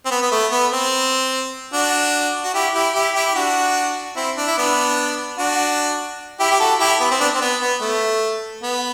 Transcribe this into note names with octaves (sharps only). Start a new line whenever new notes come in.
C4
B3
B3
A3
B3
C4
D4 F#4
F#4
E4 G4
E4 G4
E4 G4
E4 G4
G4
D4 F#4
C4 E4
D4
E4
B3 D4
D4 F#4
E4 G4
G4
F#4 A4
E4 G4
B3
C4
B3 D4
C4
B3
B3
A3
B3